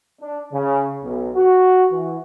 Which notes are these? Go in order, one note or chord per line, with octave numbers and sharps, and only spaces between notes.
D4
C#3
B1
F#4
E3